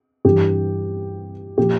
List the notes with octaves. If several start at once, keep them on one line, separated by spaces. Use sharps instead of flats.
G2 E3 G4
A#2 F3 G4